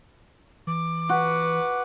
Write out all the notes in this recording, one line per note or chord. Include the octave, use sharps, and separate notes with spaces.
E3 D6
F#4 B4 F#5